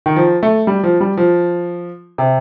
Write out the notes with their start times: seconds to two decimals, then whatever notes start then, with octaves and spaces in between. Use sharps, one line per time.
0.06 D#3
0.16 F3
0.43 A3
0.67 G3
0.83 F3
1.00 G3
1.17 F3
2.18 C3